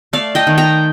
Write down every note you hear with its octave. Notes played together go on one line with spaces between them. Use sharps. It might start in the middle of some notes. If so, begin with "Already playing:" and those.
A3 D5 F5
D#5 G5
D#3
G5 A#5